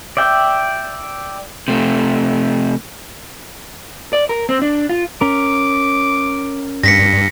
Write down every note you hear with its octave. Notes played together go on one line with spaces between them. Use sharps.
D5 E5 G5
C3 A3
D5
A#4
C4
D4
F4
C#4 A#4 D6
G2 A#6 B6 C#7